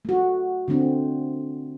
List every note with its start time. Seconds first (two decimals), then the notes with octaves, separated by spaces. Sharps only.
0.05 A3 F#4
0.68 D3 A3 C4 D4